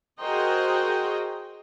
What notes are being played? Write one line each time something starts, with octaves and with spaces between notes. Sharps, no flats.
F#4 G#4 A#4 C5 D#5 G5